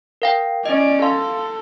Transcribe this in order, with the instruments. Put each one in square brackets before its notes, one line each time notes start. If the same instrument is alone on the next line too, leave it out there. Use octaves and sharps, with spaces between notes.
[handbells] A#4 F5 G5
[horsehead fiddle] C#4 D5 [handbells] D#5
[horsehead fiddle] A4 [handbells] F5 C6